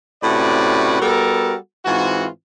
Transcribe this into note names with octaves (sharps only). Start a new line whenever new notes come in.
A2 C3 C#4 F#4 B4 D5
G3 B3 F#4 A4 A#4
G#2 E3 C4 F4 F#4